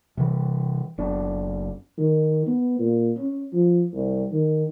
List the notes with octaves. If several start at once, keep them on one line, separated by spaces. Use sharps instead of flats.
C3 E3
F#1 D4
D#3
B3
A#2
C#4
F3
C2
D#3